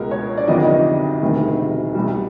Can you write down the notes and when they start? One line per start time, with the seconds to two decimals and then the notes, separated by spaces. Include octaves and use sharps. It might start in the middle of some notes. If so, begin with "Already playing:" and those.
Already playing: C#2 B2 G#3 A#4
0.11 C#5
0.37 D5
0.47 G1 F2 C3 D#3 F#3 D#5
1.21 E1 D2 C3 D#3 G3
1.95 C2 B2 G3